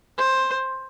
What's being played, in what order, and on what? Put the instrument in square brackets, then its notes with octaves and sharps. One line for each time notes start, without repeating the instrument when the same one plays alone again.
[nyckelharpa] C5